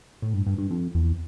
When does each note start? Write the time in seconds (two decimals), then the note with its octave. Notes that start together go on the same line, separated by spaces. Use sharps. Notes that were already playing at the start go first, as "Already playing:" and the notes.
0.22 A2
0.34 G2
0.47 G2
0.58 G2
0.70 F2
0.95 E2